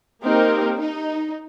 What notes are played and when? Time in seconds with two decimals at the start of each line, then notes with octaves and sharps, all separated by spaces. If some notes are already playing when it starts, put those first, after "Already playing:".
0.23 A#3 C4 D#4 G4 A#4
0.80 D#4